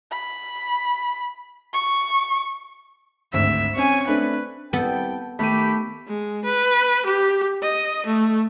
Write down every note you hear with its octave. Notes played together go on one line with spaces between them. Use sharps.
B5
C#6
G#1 D2 E5
C4 C#4 G#5 C#6
A3 C4 D4 B4
C2 G3 B3 A4 G5
D#3 A3 G4 B5 D#7
G#3
B4
G4
D#5
A3